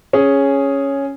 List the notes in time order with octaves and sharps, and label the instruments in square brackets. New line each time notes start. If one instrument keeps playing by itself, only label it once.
[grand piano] C#4 G#4